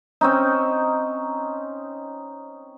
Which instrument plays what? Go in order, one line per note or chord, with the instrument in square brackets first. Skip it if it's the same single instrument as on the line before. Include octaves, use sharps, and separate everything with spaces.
[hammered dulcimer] C4 C#4 D#4